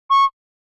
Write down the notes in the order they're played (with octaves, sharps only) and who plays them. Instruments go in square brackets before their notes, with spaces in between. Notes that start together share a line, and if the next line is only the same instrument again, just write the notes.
[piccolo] C#6